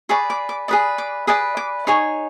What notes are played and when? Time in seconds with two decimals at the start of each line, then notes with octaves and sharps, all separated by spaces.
0.09 G#4 B4 D5 C#6
0.30 D6
0.49 D6
0.68 G#4 B4 D5 D#6
0.98 D6
1.27 G#4 B4 D5 D#6
1.57 D6
1.87 D#4 G#4 C#5 C#6